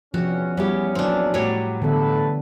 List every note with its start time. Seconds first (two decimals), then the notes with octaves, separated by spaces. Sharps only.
0.14 E2 C3 F3 C#4 F#4
0.57 G3 B3 E4 G4 C#5
0.95 A#2 F#3 C4 D4
1.34 A2 F#3 G3 F#4 C#5 D5
1.82 D3 E3 A3 B3 A4 B4